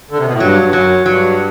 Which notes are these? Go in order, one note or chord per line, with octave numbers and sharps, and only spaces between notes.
D3
C3
B2
A2
G2 F#3
G2
F#2 F#3
G2 F#3